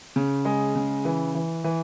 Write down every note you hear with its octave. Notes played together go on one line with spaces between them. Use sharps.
C#3
G#3
C#3
E3
E3
E3